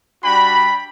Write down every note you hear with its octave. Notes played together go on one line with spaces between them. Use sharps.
G3 D4 F#4 G5 B5